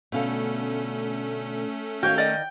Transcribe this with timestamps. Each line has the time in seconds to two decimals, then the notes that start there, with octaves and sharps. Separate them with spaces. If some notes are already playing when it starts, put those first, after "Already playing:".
0.12 B2 D3 A3 C#4 A4 F5
2.03 D#3 F#4 C#5 F5 G5
2.16 A#4 D5 D#5